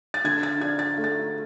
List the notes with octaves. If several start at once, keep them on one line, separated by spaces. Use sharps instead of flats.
A6
D3 G#6
A6
D4 G#6
A6
A3
A6